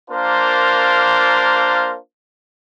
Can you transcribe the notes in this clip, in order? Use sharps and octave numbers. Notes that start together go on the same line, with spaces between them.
A#3 D4 F4 A#4 C5